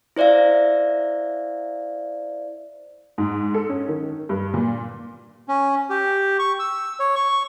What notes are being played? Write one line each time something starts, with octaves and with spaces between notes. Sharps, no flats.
E4 C5 D5 E5 F5
G#2
A4
C#4
D#3
G2
A#2
C#4
G4
C#6
E6
C#5
C#6